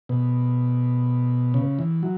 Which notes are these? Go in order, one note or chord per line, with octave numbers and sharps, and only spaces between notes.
B2
C#3
E3
F#3